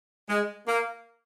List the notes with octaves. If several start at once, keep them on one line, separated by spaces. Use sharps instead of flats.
G#3
A#3